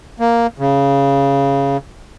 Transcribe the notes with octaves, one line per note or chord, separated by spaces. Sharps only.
A#3
C#3